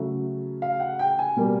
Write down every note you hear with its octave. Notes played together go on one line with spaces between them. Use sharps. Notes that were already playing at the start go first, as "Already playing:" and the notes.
Already playing: C#3 F#3 A3 E5
F5
F#5
G5
G#5
B2 G3 A#3